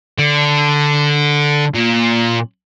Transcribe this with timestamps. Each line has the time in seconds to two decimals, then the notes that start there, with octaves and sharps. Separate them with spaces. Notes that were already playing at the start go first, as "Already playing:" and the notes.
0.18 D3
1.74 A#2